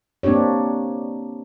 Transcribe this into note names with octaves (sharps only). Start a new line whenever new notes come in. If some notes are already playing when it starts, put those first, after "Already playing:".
A#3 C4 D4 G4 C#5